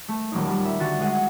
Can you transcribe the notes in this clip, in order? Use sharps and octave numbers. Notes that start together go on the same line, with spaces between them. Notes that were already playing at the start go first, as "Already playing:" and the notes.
A3
D#1 F#3 A#3 D#4
G3
E5
D3 F#4 A6
G#3 F#5 D#7